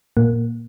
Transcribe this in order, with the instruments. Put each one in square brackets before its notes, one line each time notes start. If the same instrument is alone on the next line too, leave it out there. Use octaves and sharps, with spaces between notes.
[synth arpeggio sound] A#2 A#3